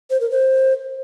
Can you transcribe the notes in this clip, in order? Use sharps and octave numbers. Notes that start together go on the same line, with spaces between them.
C5
A#4
C5